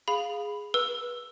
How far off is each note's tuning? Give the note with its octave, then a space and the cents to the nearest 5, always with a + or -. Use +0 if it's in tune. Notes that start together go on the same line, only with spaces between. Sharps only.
G#4 +0 F5 +10 B5 +5
B4 -25 E6 +5